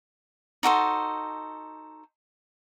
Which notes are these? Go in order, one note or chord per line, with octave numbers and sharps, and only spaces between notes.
D#4 F#4 A4 C5